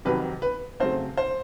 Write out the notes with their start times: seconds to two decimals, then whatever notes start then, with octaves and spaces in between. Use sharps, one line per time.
0.05 F2 C3 D#3 F#3 B4
0.42 B4
0.80 C#3 F#3 A3 C4 C5
1.17 C5